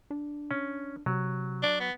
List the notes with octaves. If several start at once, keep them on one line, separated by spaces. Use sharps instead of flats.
D4
C#4
C3 F#3
D4
B3